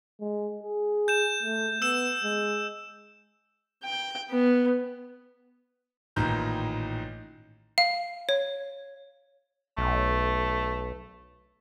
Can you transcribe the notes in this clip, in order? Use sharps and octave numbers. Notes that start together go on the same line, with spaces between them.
G#3
G#4
G6 E7
A3
B3 E6 E7
G#3
G5
B3
A1 A#2 D#3 D#4 A#5 G6
F5
C#5
B1 A3